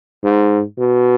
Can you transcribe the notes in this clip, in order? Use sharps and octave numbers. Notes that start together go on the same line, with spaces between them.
G#2
B2